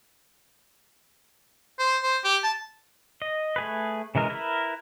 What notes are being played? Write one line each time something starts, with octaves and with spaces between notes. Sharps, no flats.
C5
C5
G4
A5
D#5
A3 G#4 B4
C#3 E3 G#3 A#4
E4 A#4 B4